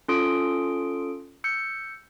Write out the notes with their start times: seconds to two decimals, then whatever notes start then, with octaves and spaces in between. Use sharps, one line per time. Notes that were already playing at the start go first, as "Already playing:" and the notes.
0.08 C#4 F4 A4 C6 D#6 D7
1.44 E6 G6 C#7